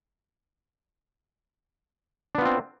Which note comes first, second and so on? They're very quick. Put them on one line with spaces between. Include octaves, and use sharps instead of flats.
D4 B3 F4 C4